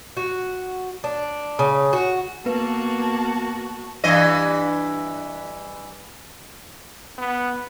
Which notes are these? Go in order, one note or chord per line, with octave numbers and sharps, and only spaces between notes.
F#4
D4
C#3
F#4
A#3 B3 F#4 B4 A5
G2 E3 D#5
B3